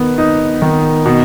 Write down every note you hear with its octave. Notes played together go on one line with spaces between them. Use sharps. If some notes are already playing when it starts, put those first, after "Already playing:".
Already playing: D#3 B3
D#4
D#3
B2